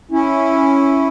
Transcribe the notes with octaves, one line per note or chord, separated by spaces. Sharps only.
C#4 E4